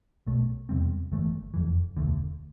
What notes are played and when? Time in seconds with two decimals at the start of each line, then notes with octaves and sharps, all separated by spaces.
0.26 B1 B2 A3
0.69 E2 C3 G3 C4
1.12 G1 G2 E3 A3
1.54 F1 F2 E3
1.97 E1 D2 D3